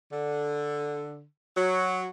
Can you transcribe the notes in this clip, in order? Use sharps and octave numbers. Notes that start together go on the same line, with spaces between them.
D3
F#3